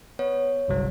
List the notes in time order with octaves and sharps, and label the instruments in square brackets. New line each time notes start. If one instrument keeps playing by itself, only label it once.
[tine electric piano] B3 [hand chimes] C#5
[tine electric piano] G1 C2 F#3